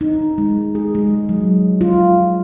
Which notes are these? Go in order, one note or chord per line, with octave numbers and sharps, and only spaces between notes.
D#4
G#3
G#4
G#3
F#3
F4